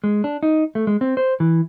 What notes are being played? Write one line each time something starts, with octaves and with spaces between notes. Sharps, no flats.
G#3
D4
D#4
A3
G#3
C4
C5
E3